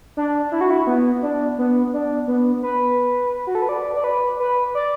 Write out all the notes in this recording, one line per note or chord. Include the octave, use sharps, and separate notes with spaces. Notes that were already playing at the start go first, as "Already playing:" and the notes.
D4
E4
F#4
E4
B3
D4
B3
D4
B3
B4
F#4
A4
B4
D5
D5
B4
B4
D5